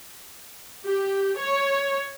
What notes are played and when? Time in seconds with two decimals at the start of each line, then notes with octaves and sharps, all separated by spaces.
0.87 G4
1.38 C#5